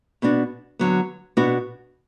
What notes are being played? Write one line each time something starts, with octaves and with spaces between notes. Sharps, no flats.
B2 B3 D4 F#4
D3 F#3 B3
B2 B3 D4 F#4